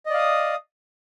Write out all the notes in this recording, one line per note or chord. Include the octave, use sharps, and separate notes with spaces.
D5 D#5 F5 D#6